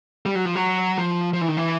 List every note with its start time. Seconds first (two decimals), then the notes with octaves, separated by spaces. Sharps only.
0.26 G3
0.35 F#3
0.45 F3
0.55 F#3
0.98 F3
1.33 F3
1.41 E3
1.48 D#3
1.57 E3